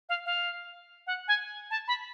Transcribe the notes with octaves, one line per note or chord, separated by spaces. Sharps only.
F5
F5
F#5
G#5
A5
B5